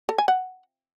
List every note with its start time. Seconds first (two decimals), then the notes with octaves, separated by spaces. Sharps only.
0.09 A4
0.18 G#5
0.28 F#5